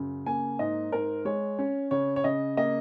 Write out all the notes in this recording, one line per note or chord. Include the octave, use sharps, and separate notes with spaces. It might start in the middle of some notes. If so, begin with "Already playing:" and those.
Already playing: F#2 C#3
A#3 G#5
G#2 D#5
G#2 A#4
G#3 C#5
C#4
C#3 C#5
C#5
C#3 D#5
A#3 D#5